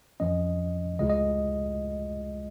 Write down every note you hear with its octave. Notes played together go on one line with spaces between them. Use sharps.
F2 F3 C#4 D#5
C#2 C#3 G#3 F4 D#5
D#5